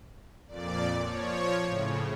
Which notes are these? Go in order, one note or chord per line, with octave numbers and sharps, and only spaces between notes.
F2 A#2 D5
F3 C#5
A2 C#3